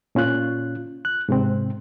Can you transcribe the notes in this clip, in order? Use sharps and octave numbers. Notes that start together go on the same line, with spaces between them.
A#2 C#4 F4 F#6
F#6
G#2 C3 C4